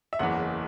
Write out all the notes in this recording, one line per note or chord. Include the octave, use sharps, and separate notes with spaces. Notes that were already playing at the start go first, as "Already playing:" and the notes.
E5
F#1 E2 C#3 E3 F#5